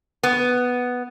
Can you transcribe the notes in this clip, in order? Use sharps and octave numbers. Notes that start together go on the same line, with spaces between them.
B3